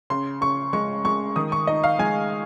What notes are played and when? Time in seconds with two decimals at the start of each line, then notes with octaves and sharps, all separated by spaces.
0.10 C#3 C6
0.41 C#3 C#6
0.73 G#3 C#6
1.05 G#3 C#6
1.36 D#3 D#6
1.52 C#6
1.67 D#4 D#5
1.84 F5
1.99 G#3 G#5